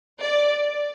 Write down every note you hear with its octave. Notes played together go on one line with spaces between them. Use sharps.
D5